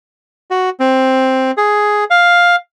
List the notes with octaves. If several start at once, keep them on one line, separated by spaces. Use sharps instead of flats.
F#4
C4
G#4
F5